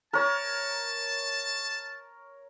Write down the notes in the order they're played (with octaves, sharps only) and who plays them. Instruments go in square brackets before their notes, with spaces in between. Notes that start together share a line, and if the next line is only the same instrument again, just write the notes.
[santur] A#4 C#5 [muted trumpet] A5